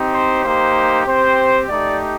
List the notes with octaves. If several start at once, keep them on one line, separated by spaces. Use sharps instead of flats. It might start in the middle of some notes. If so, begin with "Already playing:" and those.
Already playing: C4 D#4 G4
C5
A#3 D#4 G4 C5
C4 G4 C5
A3 D#4 G4 D5